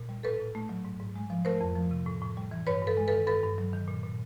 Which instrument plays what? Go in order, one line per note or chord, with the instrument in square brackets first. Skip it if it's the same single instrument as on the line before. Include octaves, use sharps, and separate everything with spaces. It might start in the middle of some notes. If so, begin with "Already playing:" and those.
Already playing: [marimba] A#2
G3
A2 A4 B4
A2
A3
F#3
G#2
G#2
G#3
F3
A3 A#4 C5
F2
F3
C3
A2
A2
G3
E3
G2 B4 C#5
G2 A4 B4
G#3
D#3 A4 B4
G2 A4 B4
G2
F#3
D#3
A#2
A#2